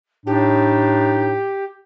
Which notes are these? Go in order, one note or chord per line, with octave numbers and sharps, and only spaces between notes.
A2 D4 D#4 G4